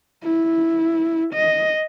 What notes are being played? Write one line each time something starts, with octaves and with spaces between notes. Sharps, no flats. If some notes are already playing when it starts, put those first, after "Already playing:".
E4
D#5